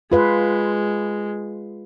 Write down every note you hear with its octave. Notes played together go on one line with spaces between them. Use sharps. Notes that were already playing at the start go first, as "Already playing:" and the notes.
G#3 F4 B4 F5